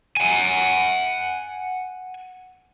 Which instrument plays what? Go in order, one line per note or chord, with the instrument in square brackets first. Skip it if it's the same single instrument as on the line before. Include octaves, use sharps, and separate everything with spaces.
[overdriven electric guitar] F#5 G#5